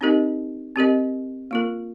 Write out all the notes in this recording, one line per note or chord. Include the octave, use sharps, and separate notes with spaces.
C4 D#4 G4 A#4 D#5
C4 G4 A#4 D#5
A#3 F4 A#4